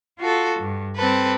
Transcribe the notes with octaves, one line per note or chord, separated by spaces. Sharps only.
F4 F#4 A4
G2
G3 C4 A4 B4